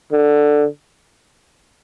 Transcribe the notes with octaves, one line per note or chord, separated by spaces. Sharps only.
D3